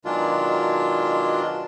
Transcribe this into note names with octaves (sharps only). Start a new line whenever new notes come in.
B2 D#3 F#3 G#3 D4 F4